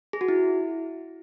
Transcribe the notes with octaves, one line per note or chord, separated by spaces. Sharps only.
G#4
F#4
E4